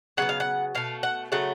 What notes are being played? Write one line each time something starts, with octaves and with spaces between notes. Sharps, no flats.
C#3 F#3 B3 F#5
F5
F#5
B2 A3 F5
F#5
C#3 F#3 A3 F#5